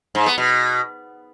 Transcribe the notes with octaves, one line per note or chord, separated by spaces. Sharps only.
G#2
B3
B2